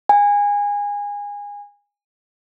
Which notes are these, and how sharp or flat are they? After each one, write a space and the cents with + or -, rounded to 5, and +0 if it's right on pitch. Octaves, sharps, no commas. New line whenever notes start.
G#5 -25